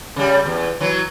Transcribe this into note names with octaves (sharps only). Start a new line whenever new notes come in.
C#3 G3
E2
E3 F#3